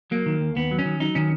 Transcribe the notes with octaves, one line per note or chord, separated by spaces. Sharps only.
F#3 A#3
D#3
D#2
D#2 B3
F#3
C#4
D#3
F#3 D#4
D#3 C#4